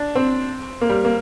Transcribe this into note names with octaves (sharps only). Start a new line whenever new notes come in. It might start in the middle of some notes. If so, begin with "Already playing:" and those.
Already playing: D4
C4
A#3
G3
A#3